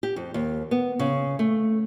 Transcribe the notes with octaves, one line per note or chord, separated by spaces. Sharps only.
G4
F2
D#2
B3
C#3
A3